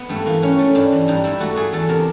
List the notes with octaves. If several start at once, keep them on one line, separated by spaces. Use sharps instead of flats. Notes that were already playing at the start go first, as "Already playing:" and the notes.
Already playing: B3
G2 A3
E3 A#3
G2 C#4
A3
G2 D4
E3
G2 D#4
G2 E4
A3 F#4
A3 G#4
E2 A4
C3 A#4